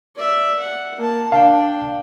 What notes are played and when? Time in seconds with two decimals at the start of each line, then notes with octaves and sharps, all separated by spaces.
0.16 D5 E5
0.60 F#5
0.97 A#3 A5
1.32 D4 F5 G5 A5